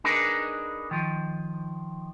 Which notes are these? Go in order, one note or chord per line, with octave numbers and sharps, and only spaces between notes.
D4 D#4 G#4 A#4 B4
D#3 F3